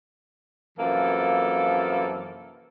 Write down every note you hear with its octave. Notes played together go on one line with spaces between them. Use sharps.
F#2 C3 E3 F3 A#3 A4